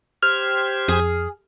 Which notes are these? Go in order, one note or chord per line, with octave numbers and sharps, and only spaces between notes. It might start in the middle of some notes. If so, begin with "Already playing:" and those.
G4 C5 F6 G#6
F2 G#4